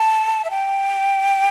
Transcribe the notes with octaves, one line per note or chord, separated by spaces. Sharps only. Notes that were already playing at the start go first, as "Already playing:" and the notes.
Already playing: A5
E5
G5